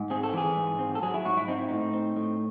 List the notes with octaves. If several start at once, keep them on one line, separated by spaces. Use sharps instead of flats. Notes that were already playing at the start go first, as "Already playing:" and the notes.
Already playing: G#2
C4 G#4
A4
E3 G#4
G#2
C4
A4
F#3 G#4
E4
G#2 F#4
E4
C4 D#4
E4
A2 D#4
C4
A2